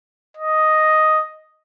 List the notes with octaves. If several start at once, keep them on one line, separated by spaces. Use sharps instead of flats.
D#5